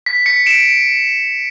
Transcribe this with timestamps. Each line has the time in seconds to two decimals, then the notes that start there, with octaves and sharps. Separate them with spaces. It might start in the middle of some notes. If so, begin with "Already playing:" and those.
0.06 B6
0.26 B6 C#7
0.46 D7 E7